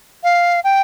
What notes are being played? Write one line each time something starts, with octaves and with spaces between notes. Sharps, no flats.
F5
G5